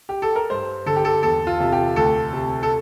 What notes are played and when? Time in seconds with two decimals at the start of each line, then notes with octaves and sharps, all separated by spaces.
0.09 G4
0.22 A4
0.36 A#4
0.50 G2 C5
0.86 D3 A4
0.96 G4
1.05 A4
1.23 E2 A4
1.47 F4
1.60 C3
1.72 G4
1.96 D2 A4
2.33 C3
2.63 A4